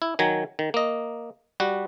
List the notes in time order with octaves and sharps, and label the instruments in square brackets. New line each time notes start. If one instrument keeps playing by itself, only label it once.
[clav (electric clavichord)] E4
D#3 F#3 G#5 A#5
D#3
A#3 D#5
G3 F#4